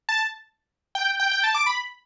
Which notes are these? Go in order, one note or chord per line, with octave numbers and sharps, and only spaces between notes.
A5
G5
G5
G5
A5
D6
B5